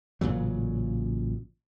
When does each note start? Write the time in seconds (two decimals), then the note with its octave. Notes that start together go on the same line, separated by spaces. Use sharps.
0.21 A1 A#2 C#3 F#3